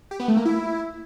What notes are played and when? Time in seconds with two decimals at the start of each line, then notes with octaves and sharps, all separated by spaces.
0.11 G4
0.20 B3
0.28 A3
0.37 A#3
0.45 E4